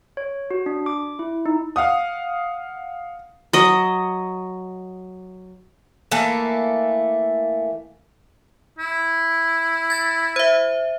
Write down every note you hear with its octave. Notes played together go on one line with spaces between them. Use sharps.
C#5
F#4
D4
D6
E4
D#4
F5 F#5 D#6
F#3 D#5
E3 A3 A#3 A4
E4
G#6 A6
C5 E5